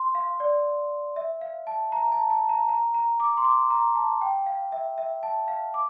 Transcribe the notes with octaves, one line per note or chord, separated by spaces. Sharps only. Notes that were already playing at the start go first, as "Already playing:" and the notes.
Already playing: C6
F5
D5
E5
F5
A5
A#5
A5
A5
A#5
A#5
A#5
D6
C6
D6
A#5
A5
G5
F5
E5
E5
A5
F5
D6